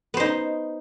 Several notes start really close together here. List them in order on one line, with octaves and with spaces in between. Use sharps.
B3 C5 D#4